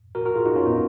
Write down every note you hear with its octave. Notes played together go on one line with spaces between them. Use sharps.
F#4 A#4
F#4 A#4
F4 G#4
D#4 F#4
C#4 F4
B3 D#4